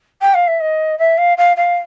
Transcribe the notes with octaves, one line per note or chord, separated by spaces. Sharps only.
G5
F5
E5
D#5
E5
F5
F5
F5